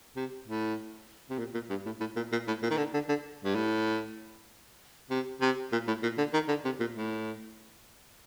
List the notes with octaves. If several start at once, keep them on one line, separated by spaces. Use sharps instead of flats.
C3
A2
C3
A#2
A#2
G2
A2
A2
A#2
A#2
A2
A#2
D#3
D3
D3
D3
G2
A2
C3
C3
A#2
A2
A#2
D3
D#3
D3
C3
A#2
A2